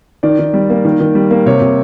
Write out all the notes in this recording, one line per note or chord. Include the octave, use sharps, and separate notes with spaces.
D#3 D5
D#3
G3
A#3
D#3
D#3
G3
A#3
C3 C#5
C3